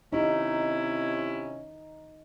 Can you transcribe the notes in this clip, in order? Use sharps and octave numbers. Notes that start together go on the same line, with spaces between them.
C3 C#4 D#4 E4